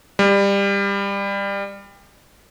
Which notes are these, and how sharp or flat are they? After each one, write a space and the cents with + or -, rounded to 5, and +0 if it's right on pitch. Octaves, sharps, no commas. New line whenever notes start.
G3 +25